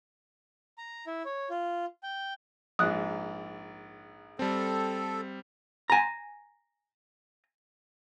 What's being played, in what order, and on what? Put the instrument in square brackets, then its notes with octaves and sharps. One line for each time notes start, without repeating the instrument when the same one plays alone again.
[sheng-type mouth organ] A#5
E4
C#5
F4
G5
[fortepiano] A#1 G#2 [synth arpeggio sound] D#6 F#6
[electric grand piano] G3 C4 [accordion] A4
[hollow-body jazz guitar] G#5 A#5